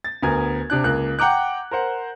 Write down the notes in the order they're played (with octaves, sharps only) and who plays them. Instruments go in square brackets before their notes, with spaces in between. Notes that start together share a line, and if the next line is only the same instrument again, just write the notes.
[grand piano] A6
D2 B3 A#4 G#5 G#6
C3 D4 F#6
C#2 A#3 F#6
F#5 G5 A#5 D6 F#6
A#4 C5 F#5